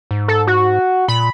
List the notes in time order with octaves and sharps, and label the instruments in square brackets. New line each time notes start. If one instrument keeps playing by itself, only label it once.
[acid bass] G#2
[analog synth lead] A4
F#4
[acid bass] A#2 [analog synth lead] B5